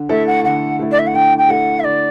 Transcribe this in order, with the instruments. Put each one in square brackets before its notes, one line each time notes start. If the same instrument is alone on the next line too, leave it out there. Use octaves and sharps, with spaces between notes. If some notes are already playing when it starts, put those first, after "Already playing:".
Already playing: [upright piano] D3
[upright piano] A3 E4 A4 [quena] E5
[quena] F#5
[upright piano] D3 [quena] F#5
[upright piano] A3 E4 A4
[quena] D5
E5
F#5
[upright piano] D3 [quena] G5
[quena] G5
[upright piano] A3 E4 A4 [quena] F#5
[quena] E5
[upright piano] D3 [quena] D5